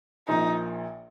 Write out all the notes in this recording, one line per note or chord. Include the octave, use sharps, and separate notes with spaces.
A#1 A#2 F3 A#3 D#4